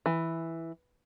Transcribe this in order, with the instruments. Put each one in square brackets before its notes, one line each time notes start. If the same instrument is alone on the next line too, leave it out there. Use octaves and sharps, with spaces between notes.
[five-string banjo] E3